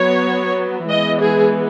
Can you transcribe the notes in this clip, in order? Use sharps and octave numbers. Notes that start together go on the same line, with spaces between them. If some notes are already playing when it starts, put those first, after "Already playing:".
Already playing: F#3 B3 C#5
E3 G#3 B3 D#5
G#4